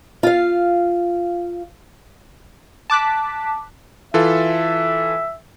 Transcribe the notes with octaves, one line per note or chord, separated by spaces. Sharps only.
F4 F5
A5 D6 F#6 B6
E3 F4 A4 E5